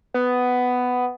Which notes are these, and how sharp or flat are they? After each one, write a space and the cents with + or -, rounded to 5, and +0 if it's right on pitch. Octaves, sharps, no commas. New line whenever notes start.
B3 +10